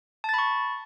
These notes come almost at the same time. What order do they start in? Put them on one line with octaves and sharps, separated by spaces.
A5 A6 B5 C#6